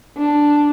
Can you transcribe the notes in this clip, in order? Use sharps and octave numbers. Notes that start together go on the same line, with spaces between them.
D4